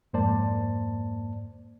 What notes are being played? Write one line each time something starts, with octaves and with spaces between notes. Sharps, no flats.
F2 G#2 A#3 C5 D5 A5